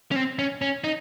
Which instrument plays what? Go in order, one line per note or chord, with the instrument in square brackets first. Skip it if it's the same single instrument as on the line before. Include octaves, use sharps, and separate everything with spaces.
[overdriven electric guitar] C#4
C4
C#4
C#4
D#4